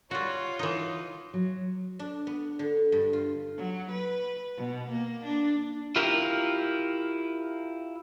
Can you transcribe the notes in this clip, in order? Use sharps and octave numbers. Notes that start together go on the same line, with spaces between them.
G3 F4 F#4 C#5
E3 D#4
F#3
D4
B3
D3
G2
F4
F#3
B4
B2
A#3
D4
E4 F4 G4 A#4